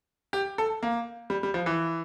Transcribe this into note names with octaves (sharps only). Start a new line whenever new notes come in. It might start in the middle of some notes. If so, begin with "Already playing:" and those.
G4
A4
A#3
G3
G3
F3
E3